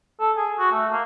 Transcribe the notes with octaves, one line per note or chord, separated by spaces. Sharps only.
A4
G#4
F#4
A3
A#3